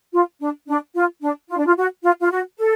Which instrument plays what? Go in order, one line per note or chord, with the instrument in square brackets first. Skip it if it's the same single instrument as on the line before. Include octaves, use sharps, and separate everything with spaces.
[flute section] F4
D4
D4
F4
D4
F4
D4
F4
F#4
F4
F4
F#4
A4